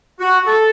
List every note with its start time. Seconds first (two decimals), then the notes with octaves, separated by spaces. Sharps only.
0.20 F#4
0.46 A4